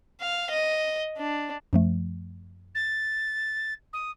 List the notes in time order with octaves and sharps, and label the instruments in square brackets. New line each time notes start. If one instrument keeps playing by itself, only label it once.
[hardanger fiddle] F5
D#5
D4
[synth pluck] F#2 F3 A3
[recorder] A6
D#6